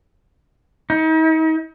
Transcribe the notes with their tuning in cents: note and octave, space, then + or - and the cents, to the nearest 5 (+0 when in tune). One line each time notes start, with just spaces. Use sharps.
D#4 +40